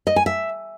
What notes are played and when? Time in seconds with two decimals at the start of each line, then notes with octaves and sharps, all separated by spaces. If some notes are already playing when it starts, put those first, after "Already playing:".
0.07 D#5
0.16 G#5
0.26 E5